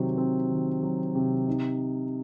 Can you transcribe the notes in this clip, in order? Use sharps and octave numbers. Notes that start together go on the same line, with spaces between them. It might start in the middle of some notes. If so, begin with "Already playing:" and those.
Already playing: C3 D#3 F#3 C4
C4
D#3
F#3
C3
D#4